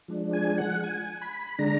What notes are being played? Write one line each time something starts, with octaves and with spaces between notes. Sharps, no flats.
F3 G#3 D4
G#5
F#5
G#5
B5
D3 G#3 D4 A#5